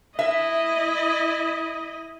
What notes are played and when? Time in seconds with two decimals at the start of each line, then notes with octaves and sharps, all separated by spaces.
0.19 E4 D#5 E5